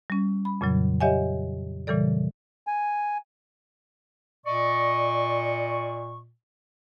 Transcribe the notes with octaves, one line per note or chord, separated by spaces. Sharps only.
G3 C#4
B5
F2 A#2 C#3 F#3
G4 C#5 D#5 E5 F#5 G#5
A#2 C#3 E3 G3 A4 D5
G#5
A#2 D5 D#5 C#6